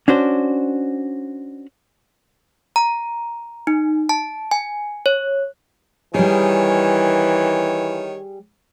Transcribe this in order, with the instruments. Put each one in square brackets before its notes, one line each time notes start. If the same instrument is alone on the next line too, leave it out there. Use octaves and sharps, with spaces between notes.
[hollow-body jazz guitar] C#4 D4 F#4 C5
[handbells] A#5
D#4
A5
G#5
C#5
[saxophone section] D#3 C#5 [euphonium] E3 [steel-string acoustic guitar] G3 G#4